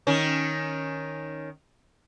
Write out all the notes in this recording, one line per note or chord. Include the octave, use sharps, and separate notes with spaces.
D#3 C#4